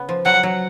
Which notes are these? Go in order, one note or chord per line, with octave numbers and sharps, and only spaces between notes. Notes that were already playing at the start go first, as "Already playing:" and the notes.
Already playing: C#3 B3
F3
F#3 F#5
F#3